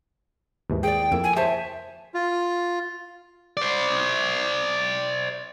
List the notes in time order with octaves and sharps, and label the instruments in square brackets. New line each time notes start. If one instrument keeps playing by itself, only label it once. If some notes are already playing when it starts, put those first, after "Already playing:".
[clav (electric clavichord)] D#2 G#2 E3
[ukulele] G#4 D5 [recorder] G5
[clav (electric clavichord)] F2 A#3 [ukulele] E4
[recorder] G#5
[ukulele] C5 C#5 A5 [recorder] E5
[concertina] F4
[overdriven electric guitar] C5 D5